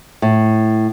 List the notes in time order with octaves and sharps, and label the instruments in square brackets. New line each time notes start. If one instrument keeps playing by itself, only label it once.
[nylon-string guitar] A2